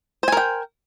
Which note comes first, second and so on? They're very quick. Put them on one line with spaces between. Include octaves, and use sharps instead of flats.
C5 G#5 A#4 G5